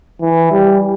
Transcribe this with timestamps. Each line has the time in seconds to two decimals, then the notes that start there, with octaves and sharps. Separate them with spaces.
0.21 E3
0.52 G3